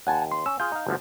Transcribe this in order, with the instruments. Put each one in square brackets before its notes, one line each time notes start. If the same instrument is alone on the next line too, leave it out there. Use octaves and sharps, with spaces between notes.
[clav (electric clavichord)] D#2 [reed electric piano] F#5 G#5 A5
[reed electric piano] C6
[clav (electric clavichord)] C#4 [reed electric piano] E6
[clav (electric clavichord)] F4 G#4 [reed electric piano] G6
[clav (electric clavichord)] D#4 F5
G1 D2 F3